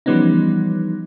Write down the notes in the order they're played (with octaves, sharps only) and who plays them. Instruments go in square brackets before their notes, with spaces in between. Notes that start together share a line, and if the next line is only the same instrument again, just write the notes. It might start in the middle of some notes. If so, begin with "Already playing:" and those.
[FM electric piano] E3 F3 G3 B3 C#4 D#4